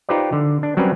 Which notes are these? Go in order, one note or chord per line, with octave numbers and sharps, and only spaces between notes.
D#4 F4 G4 B4 C5 D5
D3
D4
F#3 G3 C4 C#4 A#4 B4